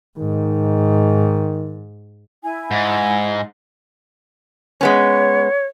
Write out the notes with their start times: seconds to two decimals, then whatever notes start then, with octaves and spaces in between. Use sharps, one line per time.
0.18 G#2 D#3
2.44 E4 G#5
2.71 G#2
4.81 G#3 B3 C#4 C#5